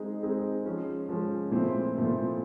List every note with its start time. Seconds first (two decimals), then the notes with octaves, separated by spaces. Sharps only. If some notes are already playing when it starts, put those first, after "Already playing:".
Already playing: G#3 C4 D#4 G#4
0.23 G#3 C4 D#4 G#4
0.65 F3 G#3 C#4
1.09 F3 G#3 C#4
1.51 A#2 F3 A3 C4 E4
1.95 A#2 F3 A3 C4 E4